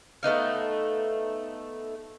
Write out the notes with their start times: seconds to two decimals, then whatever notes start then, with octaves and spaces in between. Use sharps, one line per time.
0.23 A3 B3 D#4 F5